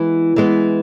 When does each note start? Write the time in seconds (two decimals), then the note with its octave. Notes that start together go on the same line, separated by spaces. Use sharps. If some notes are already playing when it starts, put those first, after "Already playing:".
Already playing: E3 G#3 B3
0.36 E3 G#3 B3